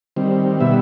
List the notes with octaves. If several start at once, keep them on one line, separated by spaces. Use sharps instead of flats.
D#3 G3 C4
B2 G3 B3 E5